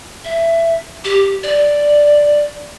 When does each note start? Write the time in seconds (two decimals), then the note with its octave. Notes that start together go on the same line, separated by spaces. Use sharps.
0.24 E5
1.04 G4
1.43 D5